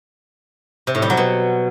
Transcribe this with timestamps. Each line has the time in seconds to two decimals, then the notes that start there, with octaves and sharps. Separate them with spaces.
0.87 C3
0.95 A2
1.02 G3
1.10 F#3
1.17 B2